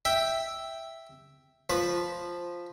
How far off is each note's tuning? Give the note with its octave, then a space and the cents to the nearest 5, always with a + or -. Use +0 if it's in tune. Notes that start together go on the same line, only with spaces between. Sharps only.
E5 +0 G5 +0
F3 +0 B4 +0